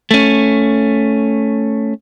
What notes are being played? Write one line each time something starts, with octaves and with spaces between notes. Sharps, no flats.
A3 C#4